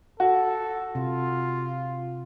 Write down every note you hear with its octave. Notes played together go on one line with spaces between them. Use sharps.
F#4 A4
C3 F4